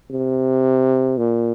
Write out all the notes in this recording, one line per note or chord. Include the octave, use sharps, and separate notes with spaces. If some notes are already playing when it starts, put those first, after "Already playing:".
C3
A#2